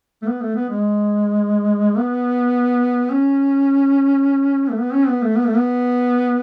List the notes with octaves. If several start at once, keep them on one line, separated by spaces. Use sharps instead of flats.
A3
B3
A3
B3
G#3
B3
C#4
A3
B3
C#4
B3
A3
B3
A3
B3